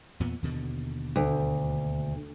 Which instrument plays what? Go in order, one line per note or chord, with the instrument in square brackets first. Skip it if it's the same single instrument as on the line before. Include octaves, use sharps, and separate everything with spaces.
[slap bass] E2 A#2 B3
D#2 B2 D3
[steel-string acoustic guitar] D2